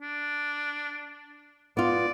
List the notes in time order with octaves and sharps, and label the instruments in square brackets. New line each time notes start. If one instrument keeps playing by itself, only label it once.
[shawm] D4
[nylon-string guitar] B3 F4 [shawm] D5